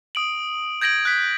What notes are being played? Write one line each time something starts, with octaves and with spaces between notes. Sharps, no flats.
D#6 D7 F#7
G6 G#6 A#6 D7 F#7
F#6 B6